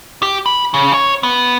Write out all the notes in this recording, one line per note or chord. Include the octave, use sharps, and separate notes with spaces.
G4
B5
C#3
C#5
B3